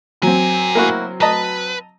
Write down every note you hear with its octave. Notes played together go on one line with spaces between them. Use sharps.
F#3 C4 A#4 G#5
A#3 E4 F#4
B4 D#5 A5 A#5